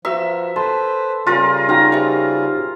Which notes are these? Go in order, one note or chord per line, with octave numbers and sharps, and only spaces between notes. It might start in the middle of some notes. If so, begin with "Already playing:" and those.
F3 F#4 B4 E5 A#5
A4 B4 C5 A5 C6
C#3 G3 F4 G#4 A#4
D#4 F#4 F5 G5 A#5
G4 C5 E5